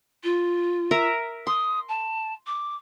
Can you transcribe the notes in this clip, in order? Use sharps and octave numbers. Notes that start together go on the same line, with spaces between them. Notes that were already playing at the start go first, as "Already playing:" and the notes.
F4
A#4 E5 A#5
C6 D#6
A5
D6